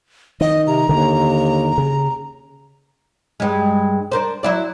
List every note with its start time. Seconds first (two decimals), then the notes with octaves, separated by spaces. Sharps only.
0.41 D#3 D#5
0.67 C3 A#5
0.89 D#2 D3 D#3
1.78 C#3
3.40 G2 G#3
4.12 D4 A#4 C5
4.43 F#3 E4 D5